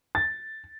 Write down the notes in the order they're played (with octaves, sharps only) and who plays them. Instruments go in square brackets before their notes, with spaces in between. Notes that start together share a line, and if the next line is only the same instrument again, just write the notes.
[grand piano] A6